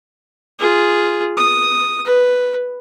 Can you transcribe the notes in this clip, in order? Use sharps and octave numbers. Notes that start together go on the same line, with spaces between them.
F4 G#4
D#6
B4